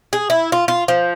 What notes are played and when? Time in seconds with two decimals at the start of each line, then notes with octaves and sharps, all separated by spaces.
0.13 G#4
0.30 E4
0.52 F4
0.68 F4
0.88 F3